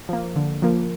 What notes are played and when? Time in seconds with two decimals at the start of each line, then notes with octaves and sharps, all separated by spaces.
0.09 F3 A#3
0.36 D3
0.62 F3 A#3